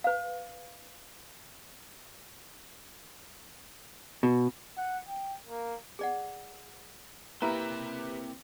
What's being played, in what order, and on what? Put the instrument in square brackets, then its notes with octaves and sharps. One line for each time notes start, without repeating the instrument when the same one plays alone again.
[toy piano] B4 F5
[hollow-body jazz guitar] B2
[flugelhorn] F#5
G5
A#3
[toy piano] G#4 D5 F#5
[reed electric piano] A#3 E4 A#4 [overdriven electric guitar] C4 E5 [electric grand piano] G4 B4 [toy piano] A#5